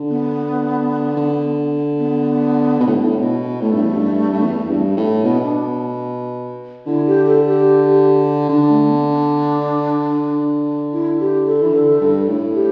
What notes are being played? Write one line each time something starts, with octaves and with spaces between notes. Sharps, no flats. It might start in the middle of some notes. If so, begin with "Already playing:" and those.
Already playing: D3
B3
D3
B3
B2
A2
G2
A2
B2
A2 A3
G2
E2
G2
G2
E2
G2
A2
B2 B3
D4
D3 E4
G4
A4
G4
D3 D4
A3
B3
D4
E4
G4
A4
E3
D3
G2
A2
G4